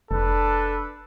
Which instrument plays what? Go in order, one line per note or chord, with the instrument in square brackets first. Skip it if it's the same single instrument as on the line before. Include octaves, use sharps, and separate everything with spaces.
[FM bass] F1 [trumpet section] D4 A4 B4